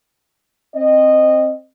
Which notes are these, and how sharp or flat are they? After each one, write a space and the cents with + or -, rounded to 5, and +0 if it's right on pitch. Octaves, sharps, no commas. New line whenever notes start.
C4 +10 D#5 -15